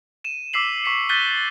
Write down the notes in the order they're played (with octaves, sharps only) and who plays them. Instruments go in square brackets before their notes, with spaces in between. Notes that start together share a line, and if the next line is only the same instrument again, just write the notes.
[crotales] D#7 E7
D6 E6 B6 C7 F#7
C#6 B6 C#7
F#6 G6 A6 B6 D#7 G7